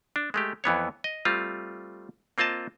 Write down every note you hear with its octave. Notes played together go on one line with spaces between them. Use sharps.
D4
G#3 A3 G4
F2 E3 B3 C#5
D#5
G3 A3 C4 F4
A#3 C4 F4 D#5 A5